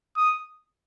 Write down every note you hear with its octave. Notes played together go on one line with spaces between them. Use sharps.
D#6